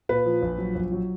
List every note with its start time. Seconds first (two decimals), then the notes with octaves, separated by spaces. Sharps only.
0.09 A#2 B4
0.26 F3
0.42 A#1
0.58 F#3
0.75 A#1
0.92 F#3